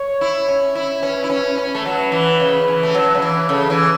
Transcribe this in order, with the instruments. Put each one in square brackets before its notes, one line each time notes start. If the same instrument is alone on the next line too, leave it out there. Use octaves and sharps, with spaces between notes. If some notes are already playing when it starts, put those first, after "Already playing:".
Already playing: [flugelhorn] C#5
[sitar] E4
C#4
E4
[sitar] C#4 [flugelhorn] B4
[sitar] E4
C#4
C#4
A3
[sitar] F#3 [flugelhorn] B4
[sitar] E3
C#3
E3
A3
F#3
C#3
E3
[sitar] C#3 [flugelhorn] A4
[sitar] E3